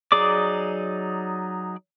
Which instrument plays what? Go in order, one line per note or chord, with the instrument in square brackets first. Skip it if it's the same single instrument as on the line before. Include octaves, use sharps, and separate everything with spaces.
[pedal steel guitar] F#3 D#4 G#4 D5 D6